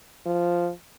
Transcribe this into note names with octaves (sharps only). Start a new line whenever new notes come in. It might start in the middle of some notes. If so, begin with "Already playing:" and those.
F3